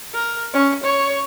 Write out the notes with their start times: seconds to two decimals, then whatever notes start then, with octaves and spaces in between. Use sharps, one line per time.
0.14 A#4
0.53 C#4
0.84 C#5